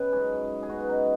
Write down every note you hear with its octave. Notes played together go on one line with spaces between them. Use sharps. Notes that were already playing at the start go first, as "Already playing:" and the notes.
Already playing: C#3 B3 B4 C#5 D#5 F#5
G#2 F#3 C#4 G#4
G#4
C#3 B3 F#4
F#4
D#4